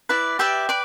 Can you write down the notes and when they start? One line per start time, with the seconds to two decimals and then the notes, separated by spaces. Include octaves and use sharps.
0.09 E4 B4 D5
0.39 G4 B4 D5 E5 G5
0.69 B4 D5